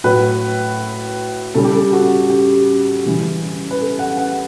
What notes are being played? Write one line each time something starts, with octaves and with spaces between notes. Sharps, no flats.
A2 F#3 B4
C#3 G3 A4
G4
A4
F#4
G4
C#3 E3 G3
B4
A4
F#5
F#5